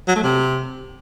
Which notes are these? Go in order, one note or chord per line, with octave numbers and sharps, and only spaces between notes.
F#3
A3
C3